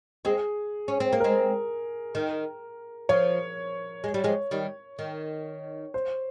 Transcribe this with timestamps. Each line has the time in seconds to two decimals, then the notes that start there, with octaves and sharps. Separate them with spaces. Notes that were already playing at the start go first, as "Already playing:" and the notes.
0.25 G#3 C4 G#4
0.88 C#4
1.00 C4
1.12 A#3
1.20 G#3 C4 A#4
2.15 D#3
3.09 F3 C#5
4.04 G#3
4.14 G3
4.24 F3 G#3
4.51 D#3 G3
4.99 D#3
5.94 C5